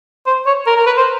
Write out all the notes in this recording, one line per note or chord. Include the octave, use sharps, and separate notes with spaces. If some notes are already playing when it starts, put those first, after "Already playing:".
C5
C#5
A#4
A#4
B4
C5